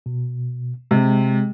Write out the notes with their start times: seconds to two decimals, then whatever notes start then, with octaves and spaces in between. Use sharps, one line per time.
0.06 B2
0.91 C3 G#3